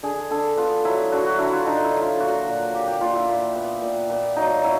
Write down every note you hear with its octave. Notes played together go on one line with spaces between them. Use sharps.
D3 G#4
D3 A4
B3 F4
F#3 E4
D3 F#4
F#4
D3 E4
F4
D3 D#4
E4
F#3
F4
A#2 F#4
A#2
A#2 G4
G4
A#2 F4
E4
A#2
B3
A#2
A#2
F#3 D#4
F#3 E4